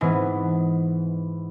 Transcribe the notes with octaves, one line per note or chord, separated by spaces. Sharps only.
G#2 E3 B3